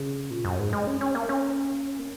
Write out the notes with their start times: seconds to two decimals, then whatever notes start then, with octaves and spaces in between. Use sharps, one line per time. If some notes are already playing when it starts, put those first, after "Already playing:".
Already playing: C#3
0.31 A#2
0.45 F#2
0.59 G#2
0.73 G#3
0.87 C#4
1.01 C#4
1.15 A#3
1.29 C#4
1.99 A#3